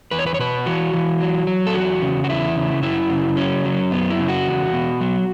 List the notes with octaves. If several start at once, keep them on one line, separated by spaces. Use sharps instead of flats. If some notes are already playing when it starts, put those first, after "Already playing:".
E2 B4
C#5
B4
C#5
B2 B4
E3 F#4
E3
F#3
F#3
A4
E2 F#4
C#3
F#4
E2 E4
C#3
F#2 E4
C#3
F#3 C#4
F#3
F#2 B3
E4
C#3
F#4
E2
B2
F#3